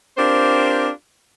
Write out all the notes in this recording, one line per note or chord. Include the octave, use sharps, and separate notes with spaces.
C4 D4 F4 G4 A#4 C5